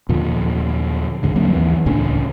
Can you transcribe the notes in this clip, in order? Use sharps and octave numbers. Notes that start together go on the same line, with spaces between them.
D#2 A#2 D3 F3
C#2 G#2 D3
D2 F#3 A#3 C4
D#2 E3
C#2 A2 C#4 D4